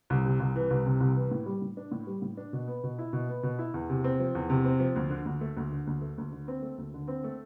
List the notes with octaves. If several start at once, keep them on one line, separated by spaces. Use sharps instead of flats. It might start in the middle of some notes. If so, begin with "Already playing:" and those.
C2
C3
C2
E3
C2
C3
C2
E3
A2
G3
A2
D4
A2
G3
A2
D4
B2
B3
B2
E4
B2
B3
B2
E4
E2
C3
C4
F3
E2
C3
C4
F3
D2
D3
D2
A3
D2
D3
D2
A3
D2
D3
C4
A3
D2
D3
C4
A3